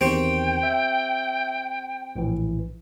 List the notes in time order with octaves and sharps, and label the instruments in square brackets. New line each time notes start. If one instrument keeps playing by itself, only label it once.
[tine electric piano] E2 D#3 [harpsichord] C4 G4 C#6 [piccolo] G5
[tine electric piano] E5
A#1 A2 E3